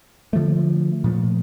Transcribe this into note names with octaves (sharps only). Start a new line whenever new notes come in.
D3 F3 A3
A#2 F3 A3